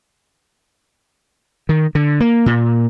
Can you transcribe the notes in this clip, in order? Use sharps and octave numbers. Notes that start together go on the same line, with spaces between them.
D#3
D3
A#3
A#2